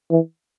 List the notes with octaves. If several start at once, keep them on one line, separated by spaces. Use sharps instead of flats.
E3